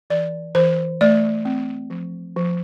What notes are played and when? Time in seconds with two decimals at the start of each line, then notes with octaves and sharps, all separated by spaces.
0.10 E3 D5
0.55 E3 C5
1.01 A3 D5
1.45 C4
1.90 F3
2.36 F3